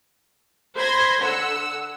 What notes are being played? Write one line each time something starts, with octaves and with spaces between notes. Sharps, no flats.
C5 B5 C6 G#6 A#6
D3 F#5 E6